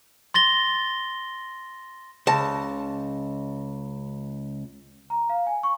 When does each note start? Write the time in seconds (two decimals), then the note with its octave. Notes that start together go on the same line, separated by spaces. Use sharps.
0.34 C6 A6 A#6 G7
2.27 C#2 A5
5.10 A#5
5.30 F5
5.47 G#5
5.63 C#6